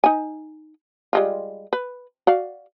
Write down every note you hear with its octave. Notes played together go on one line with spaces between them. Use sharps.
D#4 G#5
G3 G#3 F4
B4
F#4 D5 F5